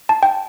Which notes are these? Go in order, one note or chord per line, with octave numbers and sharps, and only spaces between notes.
A5
G5